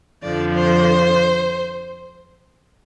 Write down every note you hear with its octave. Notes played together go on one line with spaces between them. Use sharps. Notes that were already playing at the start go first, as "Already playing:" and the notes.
F2 D3 F3 D5
C5